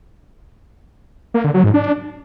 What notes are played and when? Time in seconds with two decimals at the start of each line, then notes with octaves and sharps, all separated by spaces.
1.34 A#3
1.44 D3
1.54 F#3
1.64 G#2
1.74 D4